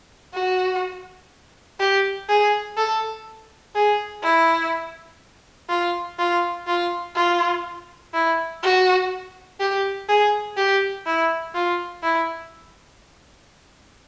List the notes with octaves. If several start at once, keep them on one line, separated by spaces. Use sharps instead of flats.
F#4
G4
G#4
A4
G#4
E4
F4
F4
F4
F4
E4
F#4
G4
G#4
G4
E4
F4
E4